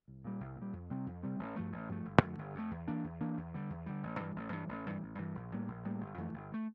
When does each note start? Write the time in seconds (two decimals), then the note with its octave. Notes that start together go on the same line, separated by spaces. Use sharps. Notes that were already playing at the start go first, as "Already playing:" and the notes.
0.08 C2
0.24 A#2 G3
0.40 C2
0.56 A#2
0.62 G3
0.73 F2
0.90 C3 G3 C4
1.06 F2
1.23 C3 G3 C4
1.39 A1
1.56 G2 F3 A3
1.72 A1
1.89 G2 F3 A3
2.05 G1
2.22 F2 D3 A3
2.39 G1
2.55 F2 D3 A3
2.71 E2
2.87 E3 A#3 D4
3.04 E2
3.21 E3 A#3 D4
3.38 E2
3.54 D3 G3
3.70 E2
3.86 D3 G3
4.03 A1
4.20 G2 E3 G3
4.36 A1
4.52 G2 E3 G3
4.69 A1
4.86 G2 E3 G3
5.02 A1
5.18 G2 E3 G3
5.35 A#1
5.52 A2 G3 A#3
5.68 A#1
5.85 A2 G3 A#3
6.00 G1
6.18 F2 E3 A3
6.33 G1
6.52 E3 A3